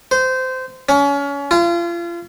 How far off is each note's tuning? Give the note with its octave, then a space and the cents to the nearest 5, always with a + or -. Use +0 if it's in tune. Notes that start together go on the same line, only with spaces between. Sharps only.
C5 -20
C#4 +30
F4 -35